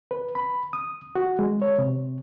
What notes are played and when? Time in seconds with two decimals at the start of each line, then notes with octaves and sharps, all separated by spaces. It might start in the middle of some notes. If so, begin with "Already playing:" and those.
0.11 B4
0.35 B5
0.73 D#6
1.15 F#4
1.39 G#3
1.62 C#5
1.78 C3